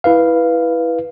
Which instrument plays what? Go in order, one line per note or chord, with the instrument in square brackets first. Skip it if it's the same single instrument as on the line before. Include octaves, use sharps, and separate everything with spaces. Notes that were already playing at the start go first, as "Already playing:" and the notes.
[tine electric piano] E4 B4 F5